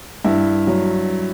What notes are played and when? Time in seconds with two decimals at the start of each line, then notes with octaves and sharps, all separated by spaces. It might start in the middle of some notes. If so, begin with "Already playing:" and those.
0.25 G2 E4
0.67 F#3